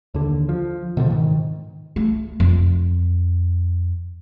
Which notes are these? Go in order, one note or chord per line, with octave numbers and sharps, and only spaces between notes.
D#2 D3
F3
B2 D3 D#3 F3
G#2 D#3
A3
F2